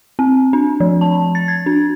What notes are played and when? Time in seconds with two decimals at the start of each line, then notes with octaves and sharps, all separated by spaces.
0.19 C4
0.53 D4
0.80 F3
1.01 A5
1.35 A6
1.48 G#6
1.66 D4